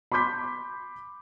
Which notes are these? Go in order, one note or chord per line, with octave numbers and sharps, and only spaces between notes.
B5 C6 D6 G6 B6